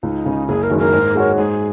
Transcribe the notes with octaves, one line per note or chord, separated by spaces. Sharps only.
C#2 D#4
C#3 G#3
F#1 G#4
A#4
F#2 D#3 G#3
A#4
G#2
G#3 F#4 C#5
G#2 G#4